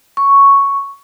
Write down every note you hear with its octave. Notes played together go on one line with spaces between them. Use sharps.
C#6